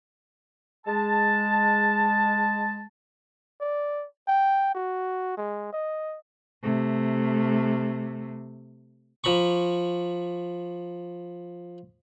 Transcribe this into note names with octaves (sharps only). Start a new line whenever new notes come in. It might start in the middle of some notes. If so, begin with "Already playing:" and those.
G#3 A5
D5
G5
F#4
G#3
D#5
C3 A3
F3 A#5 B5 C#6